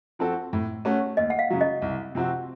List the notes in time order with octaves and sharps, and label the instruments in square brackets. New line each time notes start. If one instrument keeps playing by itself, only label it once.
[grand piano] F3 C4 F#4 A4
A2
A3 C#4 F#4
[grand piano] D#2 [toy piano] D#5
[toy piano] F#5
F5
[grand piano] C#3 F#3
[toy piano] D#5
[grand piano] C2
C3 F3 C4 F#4